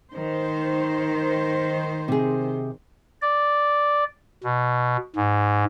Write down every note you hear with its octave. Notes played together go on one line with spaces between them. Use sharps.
D#3 C5
C3 G#4
D5
B2
G#2